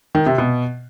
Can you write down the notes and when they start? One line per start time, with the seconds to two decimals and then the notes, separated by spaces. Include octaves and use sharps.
0.15 D#3
0.26 C3
0.38 B2